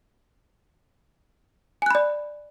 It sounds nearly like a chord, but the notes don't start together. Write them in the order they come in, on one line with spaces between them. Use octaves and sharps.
G#5 F#6 B5 D5